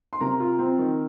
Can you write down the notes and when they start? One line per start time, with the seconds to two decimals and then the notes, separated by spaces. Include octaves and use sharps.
0.13 C6
0.21 C3 A#4 A#5
0.40 F4
0.59 C4
0.78 D#3